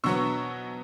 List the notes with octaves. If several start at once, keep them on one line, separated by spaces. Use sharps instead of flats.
B2 F#3 B3 C#6 E6